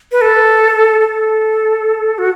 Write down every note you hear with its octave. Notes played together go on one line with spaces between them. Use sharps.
B4
A4
A4
F#4